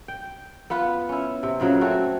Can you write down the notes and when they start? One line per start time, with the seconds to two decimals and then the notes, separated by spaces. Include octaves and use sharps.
0.08 G5
0.70 B3 F4 B4
1.09 C#4 E4
1.43 C3
1.60 A#2 C#3 F#3
1.81 A3 C4 F#4